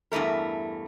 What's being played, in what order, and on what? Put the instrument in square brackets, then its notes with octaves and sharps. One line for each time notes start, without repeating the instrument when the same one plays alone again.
[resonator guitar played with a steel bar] E2 G2 E3 A3 A#4